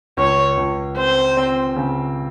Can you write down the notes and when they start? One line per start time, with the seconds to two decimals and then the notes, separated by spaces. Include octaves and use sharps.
0.17 C#2 C#5
0.57 C#2
0.97 C4 C5
1.37 C4
1.76 C#3